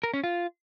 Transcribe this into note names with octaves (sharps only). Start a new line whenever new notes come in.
A#4
C#4
F4